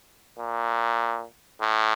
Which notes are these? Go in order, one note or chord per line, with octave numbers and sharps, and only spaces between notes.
A#2
A2